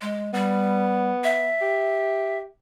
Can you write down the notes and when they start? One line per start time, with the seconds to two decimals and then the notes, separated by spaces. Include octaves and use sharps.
0.01 G#3
0.33 G3 B3
1.24 E5
1.62 G4